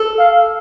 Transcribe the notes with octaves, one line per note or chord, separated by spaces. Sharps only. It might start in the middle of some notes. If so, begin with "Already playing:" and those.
Already playing: A4
F5